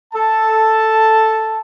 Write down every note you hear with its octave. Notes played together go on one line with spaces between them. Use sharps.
A4 A5